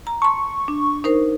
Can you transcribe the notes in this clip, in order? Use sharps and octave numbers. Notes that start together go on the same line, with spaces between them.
A#5
A5 C6 C#6
D4
D#4 A#4 C5